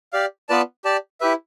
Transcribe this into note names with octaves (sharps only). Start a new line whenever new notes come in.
G4 D5 F5
B3 F4 B4 D5 A5
G4 D5 A5
E4 G4 B4 E5